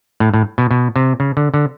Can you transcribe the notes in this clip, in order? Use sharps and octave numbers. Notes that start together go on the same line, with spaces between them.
A2
A2
B2
B2
C3
C#3
D3
D3